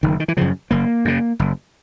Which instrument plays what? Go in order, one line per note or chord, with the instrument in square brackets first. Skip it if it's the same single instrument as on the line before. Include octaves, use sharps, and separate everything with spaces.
[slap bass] F#1 D#3
D#3
E3
F#2 C#3 F3
F#1 A#3
F#2 C#3
F#1